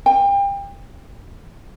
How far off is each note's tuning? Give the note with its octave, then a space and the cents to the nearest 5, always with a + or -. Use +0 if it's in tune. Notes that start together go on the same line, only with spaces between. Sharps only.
G5 +30